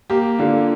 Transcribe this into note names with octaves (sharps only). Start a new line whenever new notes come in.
A#3 G4
D3 F4